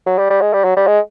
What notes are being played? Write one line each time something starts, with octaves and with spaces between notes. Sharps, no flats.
F#3
G3
G3
G#3
G3
F#3
G3
G#3